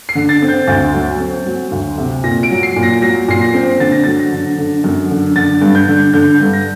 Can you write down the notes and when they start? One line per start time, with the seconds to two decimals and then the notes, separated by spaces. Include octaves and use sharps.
0.09 C7
0.15 D3
0.29 A6
0.42 C4
0.49 G6
0.68 D2 A6
0.94 F#3
1.20 C4
1.46 F#3
1.71 D2
1.98 C3
2.24 A#2 A#6
2.43 D7
2.50 F#3
2.63 C7
2.76 A#2
2.83 A#6
3.02 F#3 A#6
3.28 A#2 C7
3.41 A#6
3.54 C4
3.80 D3 A6
3.92 A#6
4.04 F#3 A6
4.19 A#6
4.32 D3
4.58 D3
4.84 F#2
5.11 D3
5.36 D3 A6
5.61 G2
5.75 G6
5.88 D3
6.13 D3 G6
6.40 G2
6.53 A#6